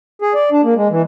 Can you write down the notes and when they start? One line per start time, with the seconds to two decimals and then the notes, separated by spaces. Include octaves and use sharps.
0.22 G#4
0.34 D5
0.52 D4
0.64 A#3
0.76 G#3
0.90 E3